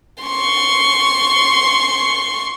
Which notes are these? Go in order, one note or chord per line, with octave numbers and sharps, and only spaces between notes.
C6 C#6